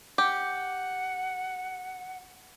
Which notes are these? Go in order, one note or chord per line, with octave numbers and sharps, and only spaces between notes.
G4 F#5